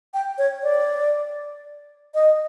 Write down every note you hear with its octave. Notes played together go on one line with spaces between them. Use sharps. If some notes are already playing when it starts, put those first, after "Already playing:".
G5
C#5
D5
D#5